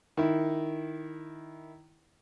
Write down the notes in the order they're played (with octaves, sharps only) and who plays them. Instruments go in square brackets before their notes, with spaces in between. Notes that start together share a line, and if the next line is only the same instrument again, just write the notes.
[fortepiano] D#3 E4